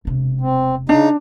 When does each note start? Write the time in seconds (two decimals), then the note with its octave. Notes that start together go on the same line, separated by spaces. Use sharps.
0.05 E1 C3
0.41 C4
0.89 C#3 D4 D#4